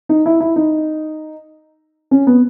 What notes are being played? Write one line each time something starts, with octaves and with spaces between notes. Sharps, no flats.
D#4
E4
E4
D#4
C#4
B3